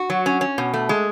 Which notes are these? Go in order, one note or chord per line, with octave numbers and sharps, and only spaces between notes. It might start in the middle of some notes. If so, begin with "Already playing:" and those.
Already playing: F#4
F#3
C#4
C#4
B2
A3
G#3